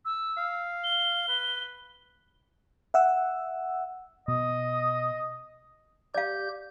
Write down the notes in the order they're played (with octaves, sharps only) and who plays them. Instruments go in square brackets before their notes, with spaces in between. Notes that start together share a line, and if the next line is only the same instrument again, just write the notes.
[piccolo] E6
[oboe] F5
[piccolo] G7
[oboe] B4
[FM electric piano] E5 F#5 E6
[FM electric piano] B2 [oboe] D#5
[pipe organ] G4 G6 [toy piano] D5 F5